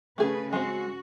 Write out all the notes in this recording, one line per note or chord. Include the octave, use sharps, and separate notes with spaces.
C#3 A3 G#4 B4
G#3 C4 F#4